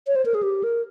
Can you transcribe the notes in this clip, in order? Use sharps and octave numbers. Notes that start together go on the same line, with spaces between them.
C#5
C5
A#4
G#4
G4
A#4